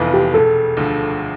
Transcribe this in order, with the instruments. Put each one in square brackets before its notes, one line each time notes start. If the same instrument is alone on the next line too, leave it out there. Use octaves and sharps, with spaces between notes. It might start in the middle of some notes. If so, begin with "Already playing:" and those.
Already playing: [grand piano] F1 F2 E3 B3 F4
[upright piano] G4
[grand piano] E1 [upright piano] A4
[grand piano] D2 D3 F3